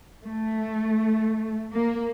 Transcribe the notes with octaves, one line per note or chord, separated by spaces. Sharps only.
A3
A#3